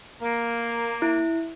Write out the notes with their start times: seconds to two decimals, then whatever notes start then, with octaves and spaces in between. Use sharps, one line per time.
0.22 A#3
1.02 E4